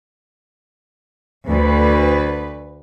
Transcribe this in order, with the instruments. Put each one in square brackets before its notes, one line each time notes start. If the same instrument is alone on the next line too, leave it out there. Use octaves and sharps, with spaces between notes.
[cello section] D2 B4